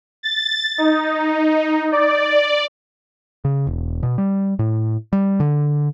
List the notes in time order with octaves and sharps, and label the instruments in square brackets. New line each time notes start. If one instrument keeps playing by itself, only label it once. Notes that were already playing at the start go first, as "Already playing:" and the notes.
[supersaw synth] A6
D#4
D5
[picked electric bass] C#3
E1
B2
G3
A2
G3
D3